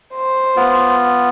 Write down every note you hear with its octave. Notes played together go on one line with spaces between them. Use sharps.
C5
B3 F4